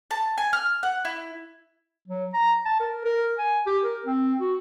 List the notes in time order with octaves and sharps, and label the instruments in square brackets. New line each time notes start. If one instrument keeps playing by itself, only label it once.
[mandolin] A5
G#5
F6
F#5
E4
[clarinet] F#3
A#5
A5
A#4
A#4
G#5
G4
A#4
C4
F#4